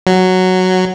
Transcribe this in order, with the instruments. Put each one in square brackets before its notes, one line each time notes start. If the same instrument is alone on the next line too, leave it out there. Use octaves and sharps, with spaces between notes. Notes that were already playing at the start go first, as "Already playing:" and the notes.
[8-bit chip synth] F#3